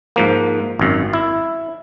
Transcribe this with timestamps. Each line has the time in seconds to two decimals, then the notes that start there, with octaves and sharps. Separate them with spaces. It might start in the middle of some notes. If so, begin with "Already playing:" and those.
0.16 G#2 F3 A#3
0.79 G#1 F#2
1.13 E4